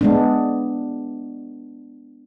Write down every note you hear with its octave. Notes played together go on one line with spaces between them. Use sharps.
G#3 B3 D4